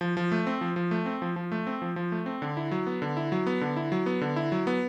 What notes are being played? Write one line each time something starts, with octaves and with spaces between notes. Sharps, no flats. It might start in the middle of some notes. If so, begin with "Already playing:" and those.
F3
F3
A3
C4
F3
F3
A3
C4
F3
F3
A3
C4
F3
F3
A3
C4
D3
E4
F#3
B3
D3
E4
F#3
B3
D3
E4
F#3
B3
D3
E4
F#3
B3